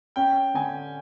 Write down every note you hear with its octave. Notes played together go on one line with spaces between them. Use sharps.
C#4 G5
D3 G#5